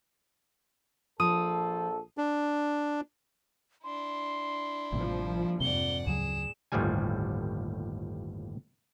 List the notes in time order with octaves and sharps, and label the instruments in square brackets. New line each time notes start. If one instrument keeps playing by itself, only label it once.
[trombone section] A#1 A4 [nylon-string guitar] F3 [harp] D#6
[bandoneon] D4
[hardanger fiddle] D4 E4 [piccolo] C6
[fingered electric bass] A1 A2 C3 [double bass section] F3 G3 A#3
[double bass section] F2 G#2 [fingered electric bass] C3 [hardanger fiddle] D5 F#5 [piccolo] G7
[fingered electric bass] D2 C#3 F#3 [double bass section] A2 [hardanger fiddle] G#4 [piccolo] E7
[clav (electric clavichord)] G1 D#2 A2 F3 G3 G#5